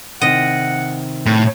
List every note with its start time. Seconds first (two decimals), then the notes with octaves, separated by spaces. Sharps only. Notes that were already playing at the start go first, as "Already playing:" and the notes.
0.21 C3 D#3 D#5 F#5
1.26 A2